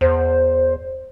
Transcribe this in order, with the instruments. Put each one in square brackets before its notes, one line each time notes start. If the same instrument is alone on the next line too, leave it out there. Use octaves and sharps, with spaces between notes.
[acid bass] E2 [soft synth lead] C5